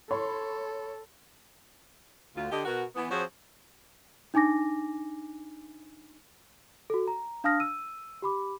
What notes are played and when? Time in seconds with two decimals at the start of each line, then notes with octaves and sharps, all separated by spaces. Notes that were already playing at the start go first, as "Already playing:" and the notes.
0.11 A4 C#5 B5 C6
2.36 D2 F4
2.51 D3 G4 D#5
2.65 B2 F#4 A#4
2.95 E3 B3
3.11 F3 C4 F#4 G#4 C5 C#5
4.34 D4 D#4 G#5 D6 A#6
6.90 F#4 A4
7.08 A#5
7.44 D4 F5 A5 D#6 F6 A#6
7.60 E6 D#7
8.22 G4 B5 D6